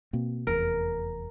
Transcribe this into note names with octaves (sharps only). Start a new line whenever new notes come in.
B2 A#3 C4
F1 E2 A#4